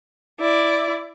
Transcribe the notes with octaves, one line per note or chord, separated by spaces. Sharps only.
E4 D5